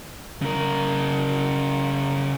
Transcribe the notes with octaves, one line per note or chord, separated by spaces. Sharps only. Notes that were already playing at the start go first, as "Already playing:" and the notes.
C#3 A#4